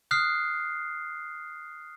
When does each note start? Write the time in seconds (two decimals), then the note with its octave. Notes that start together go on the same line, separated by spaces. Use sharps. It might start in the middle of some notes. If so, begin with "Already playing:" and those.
0.11 D#6 F6 F#6 C7